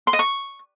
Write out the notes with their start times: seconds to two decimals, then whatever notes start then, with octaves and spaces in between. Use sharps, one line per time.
0.07 C6
0.13 D#5
0.19 C#6